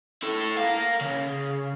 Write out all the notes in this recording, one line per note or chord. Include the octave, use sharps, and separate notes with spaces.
E4 A4
A#4 F5
C#3